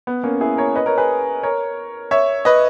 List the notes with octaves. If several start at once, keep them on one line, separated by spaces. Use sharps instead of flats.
B3
A#3 C#4
E4 G#4
A#4 C#5
B4 D#5
A#4 C#5
G#4 B4
A#4 C#5
C#5 E5
B4 D#5